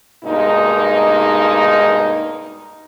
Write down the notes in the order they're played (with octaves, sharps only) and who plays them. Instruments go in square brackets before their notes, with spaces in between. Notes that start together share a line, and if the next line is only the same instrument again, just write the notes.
[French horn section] G2 B2 G#3 A#3 D#4